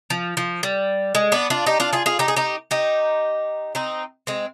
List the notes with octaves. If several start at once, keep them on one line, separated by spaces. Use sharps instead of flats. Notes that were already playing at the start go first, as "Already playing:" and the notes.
F3
F3
G3
G#3
B3 D4
D4 F4
D#4 G4
D4 F4
F4 G#4
F4 G#4
D#4 G4
G#4
D#4 G4
D#4 G4
C4 D#4
G#3 C4